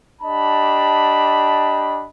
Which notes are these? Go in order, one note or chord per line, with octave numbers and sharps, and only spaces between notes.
D4 G4 D#5 A5 B5